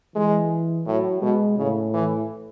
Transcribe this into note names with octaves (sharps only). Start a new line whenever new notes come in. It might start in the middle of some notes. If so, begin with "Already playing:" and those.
E3 G#3
A2 F#3
B2 G#3
A2 C#3
E3